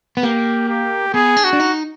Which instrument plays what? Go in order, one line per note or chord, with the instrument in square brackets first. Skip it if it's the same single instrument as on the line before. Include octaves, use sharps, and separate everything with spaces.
[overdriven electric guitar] B3
[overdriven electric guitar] A#3 [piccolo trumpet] G4
[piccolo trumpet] G4
[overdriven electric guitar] B3 [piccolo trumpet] G#4
[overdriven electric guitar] D4
[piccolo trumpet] F#4
[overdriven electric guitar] D4
D#4